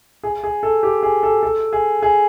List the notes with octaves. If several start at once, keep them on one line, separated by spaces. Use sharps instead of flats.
G#4
G#4
A4
G4
G#4
A4
A4
G#4
G#4